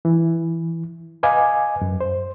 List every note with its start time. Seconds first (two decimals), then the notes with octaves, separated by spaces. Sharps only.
0.05 E3
1.23 B4 D#5 F5 G#5 D6
1.81 F#2
2.01 C5